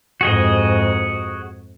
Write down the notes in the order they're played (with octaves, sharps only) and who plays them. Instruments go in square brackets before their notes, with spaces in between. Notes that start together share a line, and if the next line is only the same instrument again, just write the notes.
[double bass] F2 G#2 [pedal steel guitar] F#4 G#4 D#5